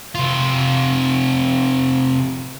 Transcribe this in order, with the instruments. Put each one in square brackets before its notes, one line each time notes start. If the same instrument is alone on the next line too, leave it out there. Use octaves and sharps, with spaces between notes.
[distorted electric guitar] C3 F4